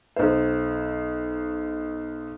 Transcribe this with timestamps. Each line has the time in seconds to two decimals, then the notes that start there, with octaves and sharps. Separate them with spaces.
0.16 B1 C5